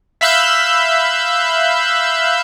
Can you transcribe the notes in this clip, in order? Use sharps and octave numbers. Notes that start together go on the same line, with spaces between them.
E5 F5 B5 E6 F#6 G6